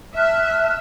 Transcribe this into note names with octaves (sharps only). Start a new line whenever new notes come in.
E5 A5 F6 F#6